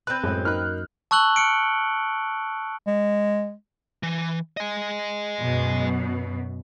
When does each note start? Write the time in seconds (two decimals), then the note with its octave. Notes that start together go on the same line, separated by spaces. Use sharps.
0.07 C4 B4 F#6 G6
0.23 F#2 A2 G#3
0.45 A#3 D#4 B5 F6 F#6
1.11 A5 C#6 E6 F#6 F#7 G7
1.36 F6 C#7 D7
2.87 G#3
4.03 E3
4.57 D#5 G#5
5.40 F#2 B2